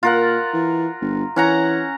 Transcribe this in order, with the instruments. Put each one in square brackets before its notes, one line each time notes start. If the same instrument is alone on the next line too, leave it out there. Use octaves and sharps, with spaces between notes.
[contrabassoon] A#2 [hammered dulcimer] F4 A#4 F#5
[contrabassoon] E3
G1
[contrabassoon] E3 [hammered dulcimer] C#4 F#5 A#5